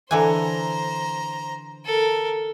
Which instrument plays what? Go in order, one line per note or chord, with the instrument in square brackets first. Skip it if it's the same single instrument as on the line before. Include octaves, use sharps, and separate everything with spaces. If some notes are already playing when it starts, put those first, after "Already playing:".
[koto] D3 E3 G#5 [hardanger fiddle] C5 A#5
[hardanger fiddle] A4 A#4